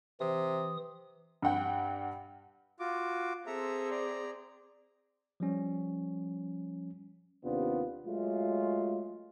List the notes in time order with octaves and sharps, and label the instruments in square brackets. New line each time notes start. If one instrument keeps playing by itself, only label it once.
[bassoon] C3 [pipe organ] E3 D#6
[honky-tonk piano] G2 G3 F#5 G5
[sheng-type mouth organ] F4 F#4 D6
[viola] C4 G#4 [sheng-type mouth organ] A4 E5 A#5
[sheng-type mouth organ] D5 A#5
[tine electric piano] F3 G3 C#4
[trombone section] D#2 C3 B3 D4 F4
F#3 G#3 A3 F4